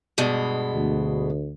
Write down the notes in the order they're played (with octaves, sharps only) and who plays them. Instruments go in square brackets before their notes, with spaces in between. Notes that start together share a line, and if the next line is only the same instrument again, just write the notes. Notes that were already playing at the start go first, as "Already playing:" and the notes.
[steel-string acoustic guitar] G2 B2 G#3
[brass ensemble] D2